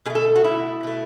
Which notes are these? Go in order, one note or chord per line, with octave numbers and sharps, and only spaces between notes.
B2 A3 G#4
A4
F#4
B2 A3 E4
B2 A3